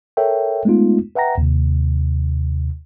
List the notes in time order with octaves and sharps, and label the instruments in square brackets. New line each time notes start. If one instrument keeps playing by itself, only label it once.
[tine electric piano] A4 A#4 C#5 E5 G5
G#3 A3 B3 D#4 F4
B4 E5 F#5 G5 A#5 A#6
D#2 C3